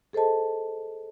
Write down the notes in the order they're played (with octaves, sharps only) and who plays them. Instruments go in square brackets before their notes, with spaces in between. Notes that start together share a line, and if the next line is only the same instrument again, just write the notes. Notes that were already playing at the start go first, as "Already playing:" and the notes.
[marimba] G#4 A4 C5 D#5 A5